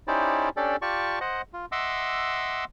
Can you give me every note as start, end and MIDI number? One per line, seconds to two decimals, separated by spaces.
0.08 0.49 61
0.08 0.49 63
0.08 0.49 64
0.08 0.49 67
0.08 0.49 72
0.08 0.49 74
0.57 0.76 61
0.57 0.76 62
0.57 0.76 67
0.57 0.76 69
0.57 0.76 74
0.82 1.19 65
0.82 1.19 67
0.82 1.19 74
0.82 1.19 81
0.82 1.19 85
1.21 1.42 72
1.21 1.42 75
1.21 1.42 78
1.53 1.66 65
1.72 2.65 75
1.72 2.65 76
1.72 2.65 78
1.72 2.65 84
1.72 2.65 86
1.72 2.65 88